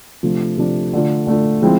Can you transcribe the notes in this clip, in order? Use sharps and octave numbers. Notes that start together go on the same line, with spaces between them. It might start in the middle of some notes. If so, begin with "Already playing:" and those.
C3 F3 A3 D4
C3 F3 A3 D4
D3 A3 D4 F4
D3 A3 D4 F4
F3 G#3 C4 E4